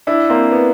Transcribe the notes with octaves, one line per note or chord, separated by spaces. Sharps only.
D4 E4
A#3 C4
B3